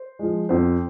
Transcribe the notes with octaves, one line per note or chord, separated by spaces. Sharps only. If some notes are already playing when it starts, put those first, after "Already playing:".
Already playing: C5
F3 G#3
F2 C5